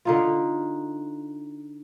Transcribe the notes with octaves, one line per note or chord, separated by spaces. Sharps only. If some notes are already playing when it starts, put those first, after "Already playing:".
D3 D#4 F4